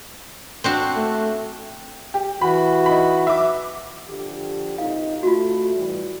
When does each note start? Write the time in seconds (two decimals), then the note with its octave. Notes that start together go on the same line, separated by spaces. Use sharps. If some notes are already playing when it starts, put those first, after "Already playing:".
0.64 C4 D4 F#4
0.96 A3
2.14 G4
2.41 E3 F#4 B5
2.86 D#4 B5
3.27 E5 D6
4.07 D3 F3 G4
4.78 A#2 C4 D#4 F5
5.23 A3 F4 F#4
5.74 A2 E3 G3